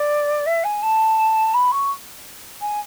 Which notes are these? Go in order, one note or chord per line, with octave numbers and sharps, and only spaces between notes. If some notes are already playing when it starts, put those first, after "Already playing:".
Already playing: D5
E5
G#5
A5
B5
C#6
G#5